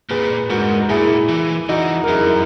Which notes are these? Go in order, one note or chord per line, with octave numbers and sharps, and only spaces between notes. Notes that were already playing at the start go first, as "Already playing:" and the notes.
A#2 G#4 B4
G#2 F#4 A#4
A#4
A#2 E4 G#4
E3
E3 D#4 F#4
A#4
F#2 E4 G#4